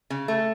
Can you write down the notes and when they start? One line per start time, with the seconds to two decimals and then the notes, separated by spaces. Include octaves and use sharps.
0.10 C#3
0.28 A3